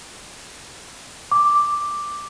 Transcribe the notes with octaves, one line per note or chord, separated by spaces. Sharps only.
D6